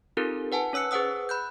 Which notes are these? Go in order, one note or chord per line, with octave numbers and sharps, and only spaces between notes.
C4 D#4 F4 G4 A4 A#4
B4 F#5 G#5 A5
C#4 C#5 E6 F#6 C#7
G#4 B4 C5 F#5 D#6 E6
B5 F#6 G6